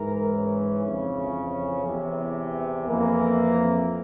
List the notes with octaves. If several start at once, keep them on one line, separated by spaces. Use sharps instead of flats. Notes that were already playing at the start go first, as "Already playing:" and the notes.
Already playing: G#2 E3 A#4
C#4
F2 C#3 E3
E2 C3 E3
F2 E3 A#3